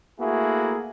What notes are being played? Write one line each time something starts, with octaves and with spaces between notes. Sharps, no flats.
A3 A#3 E4 F#4 G#4